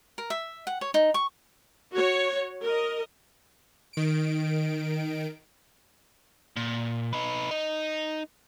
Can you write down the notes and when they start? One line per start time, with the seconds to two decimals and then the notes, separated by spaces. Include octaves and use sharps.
0.18 A#4
0.30 E5
0.67 F#5
0.81 C#5
0.94 D#4
1.14 C#6
1.93 F#4 C#5
2.63 A#4 D#5
3.93 D#3 D7
6.56 A#2
7.13 D#4 B4
7.51 D#4